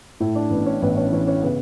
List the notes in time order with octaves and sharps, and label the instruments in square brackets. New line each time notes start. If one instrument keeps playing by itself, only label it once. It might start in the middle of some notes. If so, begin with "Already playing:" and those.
[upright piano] A2 E4
D4
A1 B3
C#4
A1 B3
C#4
E3 C#4
C#4
C#3 B3